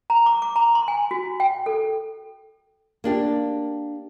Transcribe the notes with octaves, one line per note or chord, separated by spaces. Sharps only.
A#5
D6
D6
A#5
C6
G#5
F#4
G5
A4
A#3 D4 G4